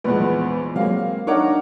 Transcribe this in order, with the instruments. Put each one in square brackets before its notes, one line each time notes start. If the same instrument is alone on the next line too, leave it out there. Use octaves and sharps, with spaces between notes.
[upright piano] A#1 E2 [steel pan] G#3 B3 B4
[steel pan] F#3 G#3 C4 [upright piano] A#3 F5
[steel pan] D4 D#4 A#4 [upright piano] C#5 F#5 D6